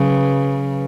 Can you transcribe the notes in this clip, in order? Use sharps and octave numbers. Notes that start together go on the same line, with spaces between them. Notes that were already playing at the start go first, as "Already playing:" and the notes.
Already playing: C#3 F#3 B4